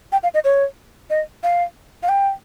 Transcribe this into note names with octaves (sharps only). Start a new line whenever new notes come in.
G5
F5
D#5
C#5
D#5
F5
F5
G5